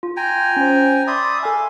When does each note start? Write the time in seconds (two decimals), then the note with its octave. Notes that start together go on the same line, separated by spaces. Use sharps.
0.03 F4
0.17 G5 G#5 A#5
0.57 C#4 C5
1.07 D5 E5 B5 C6 D#6
1.43 A4 E5 F5 G#5